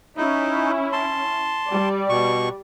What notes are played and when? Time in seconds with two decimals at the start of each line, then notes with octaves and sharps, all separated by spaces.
0.17 C#4 D#4 E4
0.92 A5 C6
1.67 G3 D5
2.09 B2 C#6